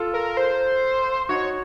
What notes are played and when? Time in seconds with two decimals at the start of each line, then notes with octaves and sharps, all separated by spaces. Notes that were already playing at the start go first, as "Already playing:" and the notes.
Already playing: F4 A4
0.14 A#4
0.37 C5
1.29 D#4 F#4 C#5